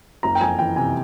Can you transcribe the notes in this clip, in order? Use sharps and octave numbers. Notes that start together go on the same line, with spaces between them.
F#1 A#5
G5
F2 G#5
E3 G5
C3 G#5